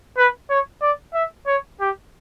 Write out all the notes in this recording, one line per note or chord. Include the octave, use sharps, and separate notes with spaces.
B4
C#5
D5
E5
C#5
G4